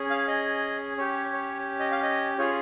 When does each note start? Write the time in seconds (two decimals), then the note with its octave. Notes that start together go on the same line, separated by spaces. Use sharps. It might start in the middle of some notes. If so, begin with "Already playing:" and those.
Already playing: C#4 G#4
0.10 F5
0.28 D#5
0.98 C#4 G4 C#5
1.33 C#5
1.80 D#5
1.91 F5
2.03 D#5
2.38 C#4 F4 G#4 C#5